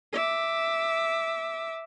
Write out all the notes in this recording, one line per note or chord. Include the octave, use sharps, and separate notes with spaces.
E5 D6